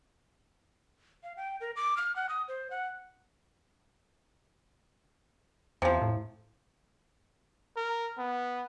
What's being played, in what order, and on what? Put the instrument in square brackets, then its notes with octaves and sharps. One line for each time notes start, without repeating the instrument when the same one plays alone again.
[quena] F5
G5
A#4
D6
F6
F#5
D#6
C5
F#5
[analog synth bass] E2 [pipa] C3 F3
[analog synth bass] A2
[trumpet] A#4
B3